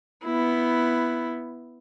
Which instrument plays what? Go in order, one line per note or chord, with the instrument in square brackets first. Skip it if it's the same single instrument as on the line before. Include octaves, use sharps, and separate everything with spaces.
[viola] B3 E4